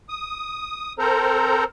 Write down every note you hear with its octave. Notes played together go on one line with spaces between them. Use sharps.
D#6
C4 A4 A#4 C5 A#5